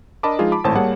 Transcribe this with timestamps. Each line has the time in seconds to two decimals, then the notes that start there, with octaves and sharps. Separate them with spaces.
0.23 D4 A#4 D#5 A5 B5 D6
0.39 F3 G#3 D#4 F4 G#4
0.52 A5 B5 D6
0.64 G#1 A2 C5 C#5 A5
0.75 G3 A#3 G#4 C#5 F#5 A5